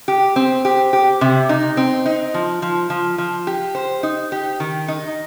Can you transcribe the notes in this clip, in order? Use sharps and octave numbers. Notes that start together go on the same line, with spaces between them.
G4
C4
G4
G4
C3
D#4
C4
D#4
F3
F3
F3
F3
G4
C5
D#4
G4
D#3
D#4